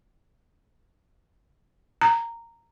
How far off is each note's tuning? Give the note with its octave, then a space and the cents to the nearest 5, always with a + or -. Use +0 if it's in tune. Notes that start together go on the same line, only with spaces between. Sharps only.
A#5 -10